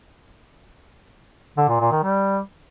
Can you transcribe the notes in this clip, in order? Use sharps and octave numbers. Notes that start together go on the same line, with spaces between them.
D3
A#2
A#2
D#3
G3